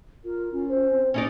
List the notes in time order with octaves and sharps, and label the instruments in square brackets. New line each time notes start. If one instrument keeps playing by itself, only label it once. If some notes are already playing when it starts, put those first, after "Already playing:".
[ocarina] F4 [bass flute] A#4
[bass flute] C#4 [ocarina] F4
[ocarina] C5
[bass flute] C4
[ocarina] A#3 [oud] C#4 D#4 D5